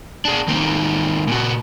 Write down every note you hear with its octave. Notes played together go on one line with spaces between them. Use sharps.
D4 G#4
D#3 A#3 C4 D#4
A#2 F#4